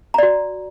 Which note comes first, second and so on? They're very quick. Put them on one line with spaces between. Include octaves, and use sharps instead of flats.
A#5 D5 F#4